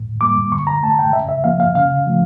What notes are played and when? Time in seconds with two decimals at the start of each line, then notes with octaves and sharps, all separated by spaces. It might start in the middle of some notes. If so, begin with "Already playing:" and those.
Already playing: A2
0.21 G3 A#3 D6
0.52 D3 C#6
0.67 A#5
0.83 A3 A5
0.99 G5
1.13 C#3 E5
1.29 E5
1.44 F3 A#3 F5
1.60 F5
1.75 C#3 F5
2.06 F3 A3